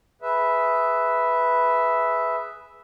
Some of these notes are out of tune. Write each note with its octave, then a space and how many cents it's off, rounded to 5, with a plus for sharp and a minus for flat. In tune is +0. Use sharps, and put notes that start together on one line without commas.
G#4 +0 B4 +0 E5 -5